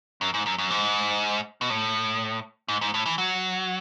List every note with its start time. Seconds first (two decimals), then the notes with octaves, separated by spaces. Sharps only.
0.21 F#2
0.34 G#2
0.46 F#2
0.58 F#2
0.70 G#2
1.61 B2
1.70 A2
2.68 G#2
2.81 G#2
2.94 A2
3.06 E3
3.18 F#3